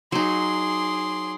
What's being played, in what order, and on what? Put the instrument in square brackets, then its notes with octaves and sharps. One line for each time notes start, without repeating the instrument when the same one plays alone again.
[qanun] F#3 D#4 [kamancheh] G#4 D6 [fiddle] C6